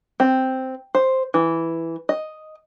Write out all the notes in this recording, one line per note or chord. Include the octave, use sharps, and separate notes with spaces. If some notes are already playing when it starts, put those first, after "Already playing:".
C4
C5
E3
D#5